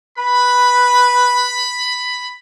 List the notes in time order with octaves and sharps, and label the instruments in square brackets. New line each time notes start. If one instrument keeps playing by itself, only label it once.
[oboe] B4 [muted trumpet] B5